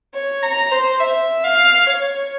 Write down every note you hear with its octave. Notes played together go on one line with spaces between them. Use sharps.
C#5
A#5
C5
E5
F5
C#5